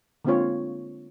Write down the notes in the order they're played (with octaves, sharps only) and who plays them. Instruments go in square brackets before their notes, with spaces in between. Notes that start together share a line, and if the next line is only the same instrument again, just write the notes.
[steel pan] D3 G#3 A#3 C4 F4 C#5